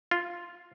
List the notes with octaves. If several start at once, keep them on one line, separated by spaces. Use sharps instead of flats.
F4